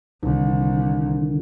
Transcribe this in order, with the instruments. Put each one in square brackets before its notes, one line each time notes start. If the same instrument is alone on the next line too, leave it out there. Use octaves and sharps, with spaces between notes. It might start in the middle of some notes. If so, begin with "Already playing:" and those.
[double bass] C2 [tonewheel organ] D3 D#3